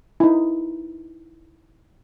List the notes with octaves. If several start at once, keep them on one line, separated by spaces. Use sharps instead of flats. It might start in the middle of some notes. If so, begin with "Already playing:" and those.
D#4 E4